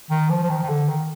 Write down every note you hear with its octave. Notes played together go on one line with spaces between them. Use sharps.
D#3
F3
F3
D#3
D#3
D3
D#3